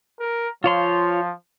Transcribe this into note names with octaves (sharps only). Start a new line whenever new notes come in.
A#4
F3 F4 C#5 C6